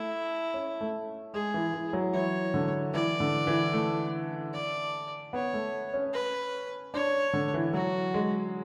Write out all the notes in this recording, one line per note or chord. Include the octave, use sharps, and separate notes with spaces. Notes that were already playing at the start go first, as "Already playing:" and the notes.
Already playing: A3 E4
C#4
A3
G#3 G#4
E3
E3
F#3
E3 C#5
D3
E3 D5
D3
E3
A3
D5
B3 C#5
A3
C#4
B4
D4 C#5
D3
E3
F#3 F#4
G#3